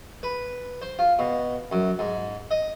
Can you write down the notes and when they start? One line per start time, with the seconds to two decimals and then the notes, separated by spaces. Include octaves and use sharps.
0.23 B4
0.82 C5
0.99 F4
1.19 B2
1.72 F#2
1.99 G#2
2.51 D#5